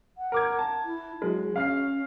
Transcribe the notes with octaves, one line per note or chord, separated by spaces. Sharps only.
F#5
A#4 D6 G#6
A5
E4
F#3 G#3
C#4 F5 F6 C7